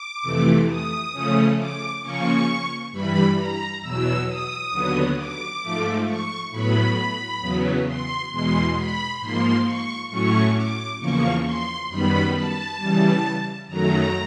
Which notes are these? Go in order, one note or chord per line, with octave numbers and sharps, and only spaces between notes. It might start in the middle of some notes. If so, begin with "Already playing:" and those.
Already playing: D6
F2 C3 E3 A3
D#6
C#3 F3 A3 C#4
D6
C#3 F3 A#3 C#4 C#6
G2 E3 G3 B5
A#5
E2 B2 F#3 E6
D#6
D#2 D3 F#3 B3
D6
G#2 F3 A3
C#6
A2 F#3 B3 B5
E2 C#3 F#3 B3
C6
E2 B2 G#3 C6
B5
G#2 F3 A#3 C6
C#6
A2 F#3 A3 C#4 C#6
D6
E2 C#3 F3 A#3 C#6
C6
F#2 D#3 G3 B3 B5
A5
C#3 E3 G3
F#2 D#3 F#3 A3 A#5